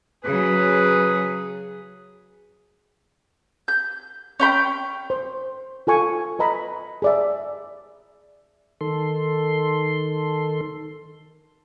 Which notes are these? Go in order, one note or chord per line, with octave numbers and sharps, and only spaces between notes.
C#3 F#3 G#4 B4
G6
C#4 G5 B5 G6
C5
F4 A4 G#5 C#6
B4 D#5 A#5 B5
G#4 D5 E5
D#3 A4 C6